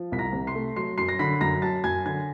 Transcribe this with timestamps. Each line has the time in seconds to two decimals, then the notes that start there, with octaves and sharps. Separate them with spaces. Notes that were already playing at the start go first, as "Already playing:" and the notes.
Already playing: F3
0.12 C2 B6
0.19 A#5 A#6
0.33 C3
0.47 C6 C7
0.55 A3
0.76 F#3 C6 C7
0.98 F#2 C6 C7
1.09 A#6
1.19 D3 B5 B6
1.41 F#2 A#5 A#6
1.62 F#3 A5 A6
1.84 F#2 G#5 G#6
2.05 D3 G#5 G#6